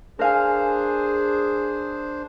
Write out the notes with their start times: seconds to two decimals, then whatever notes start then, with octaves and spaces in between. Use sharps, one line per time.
0.19 D4 G#4 A#4 C5 F5 G#5